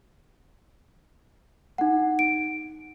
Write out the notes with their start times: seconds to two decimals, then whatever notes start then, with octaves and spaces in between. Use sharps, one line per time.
1.78 D#4 F#5
2.19 D7